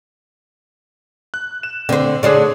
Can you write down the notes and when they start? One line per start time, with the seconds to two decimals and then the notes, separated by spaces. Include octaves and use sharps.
1.34 F#6
1.63 E7
1.89 D3 C4 C5
2.23 D3 D4 G#4 C5 C#5